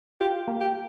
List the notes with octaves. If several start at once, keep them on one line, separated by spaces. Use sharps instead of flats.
F4 G4
A#3
G4